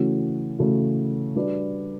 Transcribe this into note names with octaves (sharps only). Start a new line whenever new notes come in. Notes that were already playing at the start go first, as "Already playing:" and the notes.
Already playing: C#3 E3 A3 C#4 F#4
C#3 E3 A3 C#4 F#4
G3 D4 F#4 B4 D5